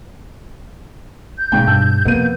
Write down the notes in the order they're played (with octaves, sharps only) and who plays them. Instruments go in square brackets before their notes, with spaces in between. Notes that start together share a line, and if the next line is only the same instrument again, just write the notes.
[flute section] G6
[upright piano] G#1 G#2 G5 [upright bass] B2
[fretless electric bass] G2 [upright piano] A5 E6
[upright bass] F2 [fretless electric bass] C3 A#3 [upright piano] B3 D#7